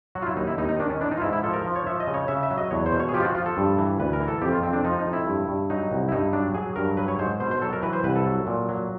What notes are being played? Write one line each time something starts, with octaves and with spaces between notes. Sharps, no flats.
F#3 F#4
F4
E4
D#2 D#4
E4
D#2 D#4
D#4
D#3 D4
C#4
E3 D4
D#4
F4
G#2 E4
E4
F3 A4
A#4
F3
C#5
F3 E5
D#5
C#3
C#5
C#3 E5
E5
F#3
D#5
E2 C#5
C5
B2
C#5
G#4
F3 G4
F4
F#4
F3 F4
A4
G2
E3
D2 B4
A#4
E3
A4
F2 G4
F4
F2 C4
D4
F3 D#4
D#4
F2
E4
G2
G2
F#3 D#4
C2
E4
G2 D#4
F#3 D4
F#3 G#4
G2 A#4
F#3 B4
C#5
G#2 C5
B2 C5
C5
F#3 A4
A#4
E3 B4
C5
C2 B4
A4
F#3
A#2
F#3